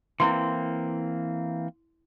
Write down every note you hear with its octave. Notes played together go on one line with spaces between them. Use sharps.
E3 A#3 C4 E4 C6